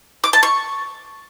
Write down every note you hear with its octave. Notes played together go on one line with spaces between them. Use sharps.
D6
A5
C#6